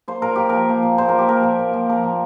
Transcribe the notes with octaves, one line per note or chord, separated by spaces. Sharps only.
A#3 C5
A#2 A#4
A#2 G4
F3 A#4
A#3
A#2
A#2 C5
F3 A#4
G4
A#3 A#4
A#2
A#2
F3
A#3 A#4
A#2